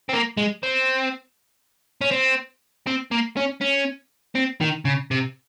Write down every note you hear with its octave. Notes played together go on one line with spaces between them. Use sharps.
C4
A#3
G#3
C4
C#4
C4
C4
A#3
C#4
C#4
C4
D#3
C#3
C3